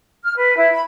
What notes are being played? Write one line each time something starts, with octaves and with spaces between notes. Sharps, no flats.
F6
B4
E4
B5